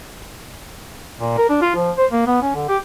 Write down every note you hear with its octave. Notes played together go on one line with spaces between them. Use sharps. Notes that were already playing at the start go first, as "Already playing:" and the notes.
A#2
A#4
D4
F4
F3
C5
A#3
B3
C#4
D3
G4